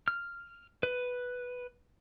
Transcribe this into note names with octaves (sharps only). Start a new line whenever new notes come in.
F6
B4